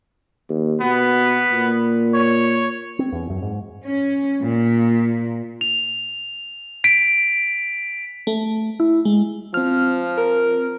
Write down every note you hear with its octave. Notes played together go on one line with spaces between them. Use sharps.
D#2
B2 B3
A#2
C#5
C4
E2
F#2
G#2
C#4
A#2
F7
B6 D7
A3
E4
G#3
F3 C4 F6
A#4